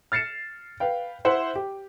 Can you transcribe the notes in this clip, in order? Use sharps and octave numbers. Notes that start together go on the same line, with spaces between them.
F6 A6 C7 C#7 E7
B4 F5 G5
E4 C5 E5 F#5
G4